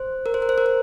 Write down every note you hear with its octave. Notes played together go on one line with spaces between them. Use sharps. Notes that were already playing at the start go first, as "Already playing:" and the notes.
Already playing: C5
A#4
C5
A#4
C5
A#4
C5